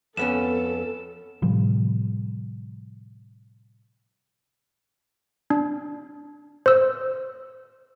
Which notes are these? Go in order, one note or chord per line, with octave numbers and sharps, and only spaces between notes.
F2 B3 C#4 A4 E7
A2 C3 F3 G3
D4
C5 E6